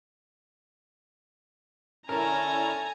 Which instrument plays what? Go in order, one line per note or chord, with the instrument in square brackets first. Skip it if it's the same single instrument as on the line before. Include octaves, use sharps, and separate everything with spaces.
[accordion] D3 C#4 E4 [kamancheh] A4 [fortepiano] A#4 [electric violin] G#5 A#5